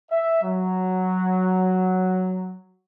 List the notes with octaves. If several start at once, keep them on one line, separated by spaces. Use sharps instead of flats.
E5
F#3